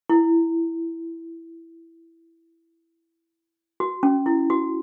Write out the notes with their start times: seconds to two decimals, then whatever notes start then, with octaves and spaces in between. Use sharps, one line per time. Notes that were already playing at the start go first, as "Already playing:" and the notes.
0.10 E4
3.80 F#4
4.03 C#4
4.26 E4
4.50 F#4